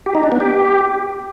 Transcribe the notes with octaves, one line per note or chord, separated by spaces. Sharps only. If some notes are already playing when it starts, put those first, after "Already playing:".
G4
D#4
D4
B3
G4